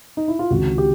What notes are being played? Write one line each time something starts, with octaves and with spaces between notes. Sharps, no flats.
D#4
E4
F4
C#2 C3 D#3 F#4
G4